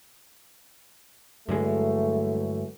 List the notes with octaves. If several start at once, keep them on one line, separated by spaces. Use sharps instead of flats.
G2 D3 E3 F#3 G#3 A3